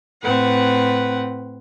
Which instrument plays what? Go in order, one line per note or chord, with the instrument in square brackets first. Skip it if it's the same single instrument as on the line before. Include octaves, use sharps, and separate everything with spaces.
[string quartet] A2 C4 B4 F#5